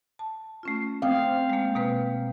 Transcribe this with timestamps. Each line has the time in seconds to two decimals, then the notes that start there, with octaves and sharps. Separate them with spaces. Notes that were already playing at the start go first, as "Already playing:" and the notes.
0.19 A5
0.63 A3 C#4 F4
1.02 C4 F5 G5 D6 D#6
1.49 G#3 A#3
1.75 B2 A#3 B4